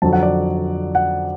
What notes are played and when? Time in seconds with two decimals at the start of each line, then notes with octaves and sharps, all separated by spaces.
0.02 F2 D3 F#3 A5
0.13 F#5
0.23 D5
0.95 F#5